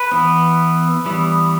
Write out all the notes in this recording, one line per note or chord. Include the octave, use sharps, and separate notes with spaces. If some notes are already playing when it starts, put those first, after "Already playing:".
Already playing: B4
E3 B3
E3 G3 B3